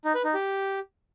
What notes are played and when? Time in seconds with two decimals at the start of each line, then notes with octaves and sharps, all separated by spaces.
0.05 D#4
0.15 B4
0.24 D#4
0.34 G4